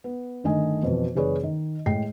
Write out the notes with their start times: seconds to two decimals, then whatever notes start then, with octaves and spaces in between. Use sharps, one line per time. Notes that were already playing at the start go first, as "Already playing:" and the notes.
0.04 B3
0.44 G1 D3 D#3 A3 D#5 G#5
0.83 F2 B2 E3
1.15 F#1 E3 G#4 B4 C#5 D5
1.43 D#3
1.86 A2 G#3 G5 C7